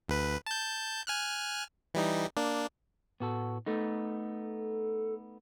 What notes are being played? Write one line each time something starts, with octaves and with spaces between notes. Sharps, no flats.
D2 B4
A5 G6
G#5 F6 F#6
E3 G3 D#4
A#3 D4
A2 B3 F#4 A4
A3 B3 D#4 A4